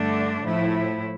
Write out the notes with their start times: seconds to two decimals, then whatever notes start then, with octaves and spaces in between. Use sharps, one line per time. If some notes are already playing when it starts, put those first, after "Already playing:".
Already playing: G2 D3 A3 D4
0.43 A2 F3 A3 E4